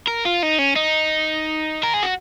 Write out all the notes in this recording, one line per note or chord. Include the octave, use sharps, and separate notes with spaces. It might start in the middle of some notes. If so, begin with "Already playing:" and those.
A#4
F4
D#4
C#4
D#4
A#4
G#4
F#4